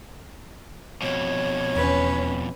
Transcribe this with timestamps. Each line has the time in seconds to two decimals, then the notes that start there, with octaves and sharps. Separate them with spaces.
1.02 F2 B2 C#5
1.76 E2 C#4 B4